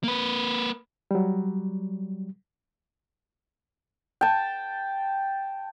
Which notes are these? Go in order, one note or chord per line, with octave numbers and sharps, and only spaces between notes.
A#3 B4
F#3 G3
G5 A5